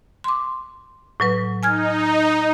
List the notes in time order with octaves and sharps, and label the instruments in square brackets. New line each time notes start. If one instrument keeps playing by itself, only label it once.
[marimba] C6 D6
A2 F#3 B4
[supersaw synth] D#4 [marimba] G#5 F6 G#6